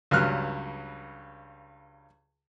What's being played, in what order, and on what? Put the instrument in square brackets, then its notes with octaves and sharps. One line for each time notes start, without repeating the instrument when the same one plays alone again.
[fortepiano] C#2 G2 F#3 F6 F#6